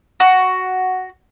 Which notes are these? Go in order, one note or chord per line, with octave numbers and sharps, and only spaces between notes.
F#4